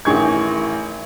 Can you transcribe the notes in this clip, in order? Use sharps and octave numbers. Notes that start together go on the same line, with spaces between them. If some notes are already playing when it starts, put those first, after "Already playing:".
A1 D#3 E3 G#4 C#6 G#6